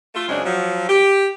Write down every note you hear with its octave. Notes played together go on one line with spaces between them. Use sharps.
A3 F4
F#2 C#3 G#3 C4 D4
F3 F#3
G4